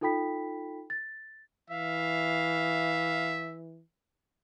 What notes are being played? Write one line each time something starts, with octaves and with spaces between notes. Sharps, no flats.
D#4 F4 A4 G5 B5 B6
A6
E3 E5 F5